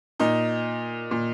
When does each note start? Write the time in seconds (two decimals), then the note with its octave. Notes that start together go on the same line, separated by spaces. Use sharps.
0.20 A#2 D#4
1.11 A#2